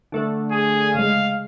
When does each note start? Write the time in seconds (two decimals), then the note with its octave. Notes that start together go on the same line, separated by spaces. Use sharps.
0.12 D3 A3 D4
0.52 G#4
0.95 C#3 G#3 F5